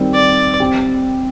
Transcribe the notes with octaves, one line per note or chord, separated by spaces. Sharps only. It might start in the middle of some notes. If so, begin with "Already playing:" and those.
Already playing: D#3 G3 C4
D5
C4 G4